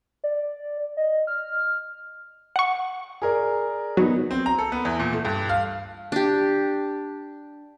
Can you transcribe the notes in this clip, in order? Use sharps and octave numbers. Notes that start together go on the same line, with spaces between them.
D5
D#5
F6
F#5 C#6
G#4 A#4 D5
F#3 B3 D#4
C4
A#5
A4
B3
E2
A#2
A3
G2
F5
D4 G4